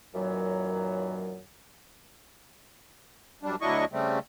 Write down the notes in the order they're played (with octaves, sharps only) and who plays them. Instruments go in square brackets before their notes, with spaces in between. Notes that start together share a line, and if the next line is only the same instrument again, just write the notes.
[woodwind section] F#2 A#2 D#3 E3 F#3
[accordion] F#2 G3 D4
D2 F#3 D4 E4 D#5 C#6
C#3 G3 A3 C4